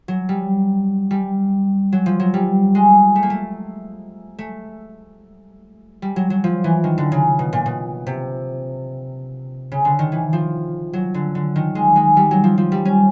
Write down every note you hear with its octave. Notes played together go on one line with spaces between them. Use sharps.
F#3
G3
G3
F#3
F3
F#3
G3
G#3
A3
A#3
A3
A3
G3
F#3
F#3
F3
E3
D#3
D3
C#3
B2
A#2
B2
C3
C#3
D3
D#3
E3
F3
F#3
D3
D3
D#3
G#3
G#3
G3
F#3
F3
F3
G3
C#4